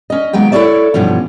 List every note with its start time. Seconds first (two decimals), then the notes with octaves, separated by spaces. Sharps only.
0.10 C#4 D#5
0.33 D#2 F#3 G#3 B3 G5
0.52 E4 A4 B4 C#5 D5 E5
0.94 G2 B2 E3 F3 C#4